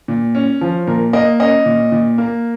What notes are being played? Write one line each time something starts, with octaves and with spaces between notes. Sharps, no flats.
A#2
C#4
F3
A#2 A#4
A#3 D#5
C#4 D#5
A#2
A#2
A#3